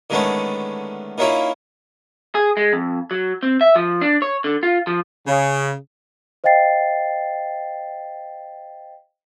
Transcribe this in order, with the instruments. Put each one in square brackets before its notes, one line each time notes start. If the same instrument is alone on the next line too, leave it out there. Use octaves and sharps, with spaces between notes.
[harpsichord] D3 D#3 G#3 A3 B3 C#4
D#3 A#3 C#4 E4 F4
[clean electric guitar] G#4
G#3
F2
F#3
C4
E5
F3
D4
C#5
D3
F4
F3
[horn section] C#3
[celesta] C5 D#5 F5 G5 A6 C7